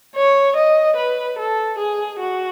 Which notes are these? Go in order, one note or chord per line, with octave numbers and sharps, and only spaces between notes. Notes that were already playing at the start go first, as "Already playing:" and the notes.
C#5
D#5
B4
A4
G#4
F#4